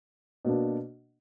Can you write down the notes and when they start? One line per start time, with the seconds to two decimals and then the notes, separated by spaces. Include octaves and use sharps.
0.45 B2 A#3 D4